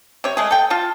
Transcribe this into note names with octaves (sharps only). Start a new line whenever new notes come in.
C3 C#5
G#3 A3 G#4
A4 G5
F4 A5